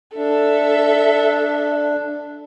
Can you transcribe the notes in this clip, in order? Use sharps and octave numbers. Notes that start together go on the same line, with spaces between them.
D4 A4 E5